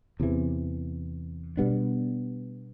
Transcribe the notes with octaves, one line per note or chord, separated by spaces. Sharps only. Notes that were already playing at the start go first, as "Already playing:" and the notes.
E2 C3 E3
B2 G3 B3 D4